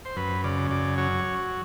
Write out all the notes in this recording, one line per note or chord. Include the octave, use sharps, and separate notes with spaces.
C5
F#2 B4
C#3 D5
F#2 D5
F#3 C#5